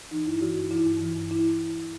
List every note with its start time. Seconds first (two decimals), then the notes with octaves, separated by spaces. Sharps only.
0.11 E3 D#4
0.26 G2 E4
0.41 E3 F#4
0.56 G2
0.71 E3 E4
0.86 G2
1.02 E3
1.16 G2
1.31 E4